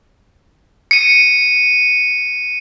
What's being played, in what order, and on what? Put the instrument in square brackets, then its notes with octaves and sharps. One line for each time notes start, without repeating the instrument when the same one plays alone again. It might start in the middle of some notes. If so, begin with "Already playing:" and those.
[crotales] C#7 D#7